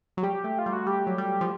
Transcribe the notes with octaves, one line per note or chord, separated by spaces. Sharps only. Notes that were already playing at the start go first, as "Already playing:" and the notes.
F#3
G3 G4
A3
F4
G3
F#4
G3 G4
F#3
G3
F3